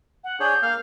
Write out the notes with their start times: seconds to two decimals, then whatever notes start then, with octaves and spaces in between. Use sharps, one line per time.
0.24 F#5
0.40 D4 G#4 C#5 G6
0.63 A#3 F5 F6